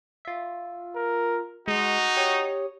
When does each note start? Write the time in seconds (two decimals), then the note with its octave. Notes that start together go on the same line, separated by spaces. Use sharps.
0.25 F4 E5
0.96 A#4
1.68 G#3 D#4 F#4
2.16 G4 C#5 D#6